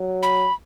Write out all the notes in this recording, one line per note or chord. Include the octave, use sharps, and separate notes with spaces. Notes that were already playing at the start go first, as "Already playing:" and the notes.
Already playing: F#3
B5